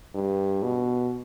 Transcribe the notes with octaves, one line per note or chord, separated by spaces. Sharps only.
G2
B2